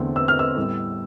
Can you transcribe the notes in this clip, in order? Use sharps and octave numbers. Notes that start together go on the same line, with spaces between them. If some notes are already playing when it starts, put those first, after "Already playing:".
Already playing: E2 D3 A3 C4
E6
F6
E6
A2 G3 B3